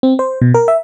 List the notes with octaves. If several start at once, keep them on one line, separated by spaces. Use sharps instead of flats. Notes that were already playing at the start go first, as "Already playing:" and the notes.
C4
C5
B2
A#4
E5